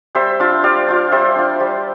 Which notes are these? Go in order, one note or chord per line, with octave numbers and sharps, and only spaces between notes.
G3 C5 E5
D4 F4
G3 D5 F5
D4 F4
G3 C5 E5
D4 F4
G3